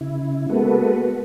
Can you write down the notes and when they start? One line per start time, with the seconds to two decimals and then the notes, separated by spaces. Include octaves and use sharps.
0.01 C#3 E4
0.50 G#3 A#3 B3 F#4 A4 B4